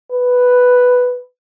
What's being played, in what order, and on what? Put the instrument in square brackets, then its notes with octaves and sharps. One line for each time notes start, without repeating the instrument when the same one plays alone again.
[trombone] B4